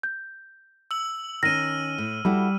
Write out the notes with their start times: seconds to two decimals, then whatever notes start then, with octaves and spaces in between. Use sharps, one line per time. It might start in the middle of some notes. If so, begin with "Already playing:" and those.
0.03 G6
0.91 E6 F#7
1.43 D#3 C#4 F6 A#6 D#7
1.98 A2
2.25 G3 E4 F#4 A4